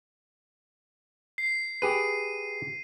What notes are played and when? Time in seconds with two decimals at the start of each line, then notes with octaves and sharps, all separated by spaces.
1.38 C7
1.82 G4 G#4 B4 D#7